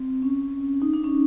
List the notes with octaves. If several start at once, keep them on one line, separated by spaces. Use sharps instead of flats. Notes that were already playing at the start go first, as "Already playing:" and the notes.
Already playing: C4
C#4
D#4
D4
C#4